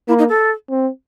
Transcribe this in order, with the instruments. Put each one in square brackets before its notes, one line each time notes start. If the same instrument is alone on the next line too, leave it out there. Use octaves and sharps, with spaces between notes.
[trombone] A#3 [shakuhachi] E4
[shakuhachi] D#4
A4
[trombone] C4